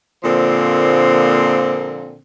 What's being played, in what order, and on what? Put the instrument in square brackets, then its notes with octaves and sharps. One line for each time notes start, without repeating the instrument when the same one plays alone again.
[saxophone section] A#2 D3 F3 A#3 C4